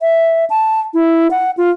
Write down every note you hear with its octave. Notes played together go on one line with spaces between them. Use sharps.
E5
A5
E4
F#5
F4